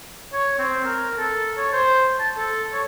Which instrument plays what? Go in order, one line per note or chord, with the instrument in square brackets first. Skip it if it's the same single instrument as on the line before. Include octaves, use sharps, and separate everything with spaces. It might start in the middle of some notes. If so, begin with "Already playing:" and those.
[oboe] C#5
C4
A#4
A4
C#5
C5
A5
A4
C#5